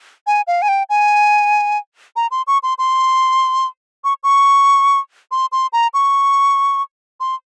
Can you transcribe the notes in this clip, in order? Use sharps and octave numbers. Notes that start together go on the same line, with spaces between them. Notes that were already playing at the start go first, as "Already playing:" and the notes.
G#5
F5
G#5
G5
G#5
A#5
C6
C#6
C6
C6
C#6
C#6
C6
C6
A#5
C#6
C6